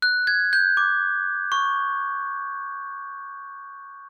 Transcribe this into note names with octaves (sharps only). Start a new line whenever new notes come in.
F#6
G#6
G6
D6
C#6